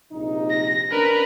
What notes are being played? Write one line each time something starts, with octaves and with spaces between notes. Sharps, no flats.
A#1 C3 D#4
A#6
C#4 D4 A#4 B4